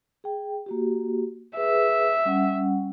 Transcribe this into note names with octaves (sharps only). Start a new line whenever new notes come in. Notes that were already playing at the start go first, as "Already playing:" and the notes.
G#4 G5
A#3 F#4 G4
G#4 B4 E5
G3 C#4 F#5